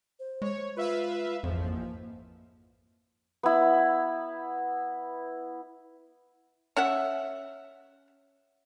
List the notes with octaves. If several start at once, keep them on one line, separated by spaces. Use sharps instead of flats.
C5
G#3 C#5
F4 B4 E5 F5
A1 F2 G#2 F3
A#3
B3 E4
C#4 E5 F#5